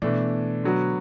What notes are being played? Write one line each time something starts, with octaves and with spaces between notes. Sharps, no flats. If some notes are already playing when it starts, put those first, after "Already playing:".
B2 E3 A3 D4
D3 F#3 B3 F#4